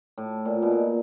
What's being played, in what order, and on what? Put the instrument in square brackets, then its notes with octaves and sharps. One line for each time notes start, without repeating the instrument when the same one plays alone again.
[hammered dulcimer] A2
A#2
B2
A#2